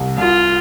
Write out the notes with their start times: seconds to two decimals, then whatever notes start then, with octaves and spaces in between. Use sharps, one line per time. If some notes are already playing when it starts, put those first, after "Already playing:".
Already playing: C2 C3
0.17 C2 F4